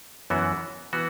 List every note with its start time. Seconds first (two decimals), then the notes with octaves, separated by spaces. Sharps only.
0.30 F#2 E3 B3 F#4
0.93 E3 B3 F#4